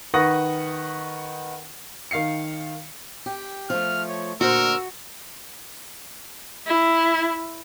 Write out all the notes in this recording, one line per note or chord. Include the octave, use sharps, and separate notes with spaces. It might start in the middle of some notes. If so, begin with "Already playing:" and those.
D#3 B4 F#5 C#6 D#6 A#6
D#3 F5 C7 C#7
G4
F3 A3 F6
C#5
A#2 D3 F#4 A#4 C5 E6
E4